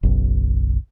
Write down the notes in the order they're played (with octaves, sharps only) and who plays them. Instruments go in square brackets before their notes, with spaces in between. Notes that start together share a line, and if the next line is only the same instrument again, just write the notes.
[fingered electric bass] F#1 B1